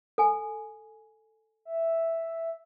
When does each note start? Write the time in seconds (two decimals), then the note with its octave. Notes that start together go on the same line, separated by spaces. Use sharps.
0.18 A4 G#5
1.65 E5